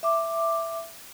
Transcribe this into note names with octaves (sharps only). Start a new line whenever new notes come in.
E5 D6